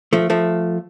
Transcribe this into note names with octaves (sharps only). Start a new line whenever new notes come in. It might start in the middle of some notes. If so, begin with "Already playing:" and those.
F3 A3
F3 A3